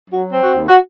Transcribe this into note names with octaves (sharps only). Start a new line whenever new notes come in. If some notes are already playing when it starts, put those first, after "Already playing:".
F#3 F#4
C4
F#4
D#2
F#4